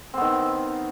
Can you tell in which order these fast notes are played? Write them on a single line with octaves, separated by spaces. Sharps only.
C4 B3 D#3